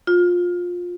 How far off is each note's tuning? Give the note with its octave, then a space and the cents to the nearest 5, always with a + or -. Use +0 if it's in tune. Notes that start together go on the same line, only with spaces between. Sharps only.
F4 +20